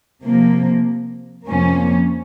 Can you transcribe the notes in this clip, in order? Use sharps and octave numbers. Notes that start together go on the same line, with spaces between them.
C3 F3 A#3
F2 C3 F3 A#3 C#4